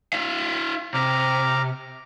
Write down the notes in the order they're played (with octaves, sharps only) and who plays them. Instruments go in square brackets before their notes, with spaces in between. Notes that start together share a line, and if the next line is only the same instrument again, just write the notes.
[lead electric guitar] E4 F5
[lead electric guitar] C3 [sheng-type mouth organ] A#5 D6 F6